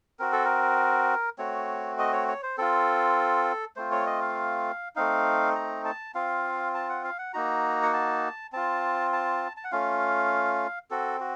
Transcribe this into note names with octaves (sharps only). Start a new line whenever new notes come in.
C4 F#4 A#4
A4
A#4
A3 C4 F#4 C#5
D#5
C#5
C#5
C5
C4 F4 A4
A3 C4 F4 C5
C#5
D#5
F5
A3 C4 D#4 F5
A#5
A5
C4 F4 F5
A5
F#5
F5
F#5
A#3 D#4 F#4 A#5
F#5
A5
C4 F4 A5
A5
A5
F#5
A3 C#4 F4 F5
C4 F#4 A4
F#4